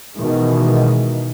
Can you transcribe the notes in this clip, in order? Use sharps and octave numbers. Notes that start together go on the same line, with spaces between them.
B2 D#3 E3 G#3